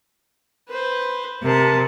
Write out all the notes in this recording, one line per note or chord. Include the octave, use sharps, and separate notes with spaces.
B4 C5
C3 A#4 A5